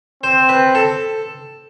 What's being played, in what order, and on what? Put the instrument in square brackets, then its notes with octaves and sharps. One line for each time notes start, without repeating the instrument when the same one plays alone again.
[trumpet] C4 [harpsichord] C5
[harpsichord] B4
A4